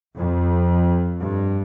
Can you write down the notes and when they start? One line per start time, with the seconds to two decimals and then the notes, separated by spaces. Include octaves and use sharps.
0.16 F2
1.21 G2